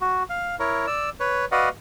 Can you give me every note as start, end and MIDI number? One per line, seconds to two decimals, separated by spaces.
0.01 0.23 66
0.29 0.56 77
0.59 0.86 64
0.59 0.86 70
0.59 0.86 73
0.87 1.10 74
0.87 1.10 88
1.20 1.45 71
1.20 1.45 73
1.52 1.69 66
1.52 1.69 71
1.52 1.69 74
1.52 1.69 75
1.52 1.69 77
1.52 1.69 78